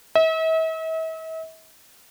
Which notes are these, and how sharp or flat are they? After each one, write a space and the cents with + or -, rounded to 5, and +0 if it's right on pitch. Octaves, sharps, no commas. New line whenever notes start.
E5 -40